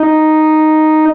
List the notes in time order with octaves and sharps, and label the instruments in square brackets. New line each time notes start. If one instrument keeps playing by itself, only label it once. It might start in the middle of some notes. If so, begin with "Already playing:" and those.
Already playing: [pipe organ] D#4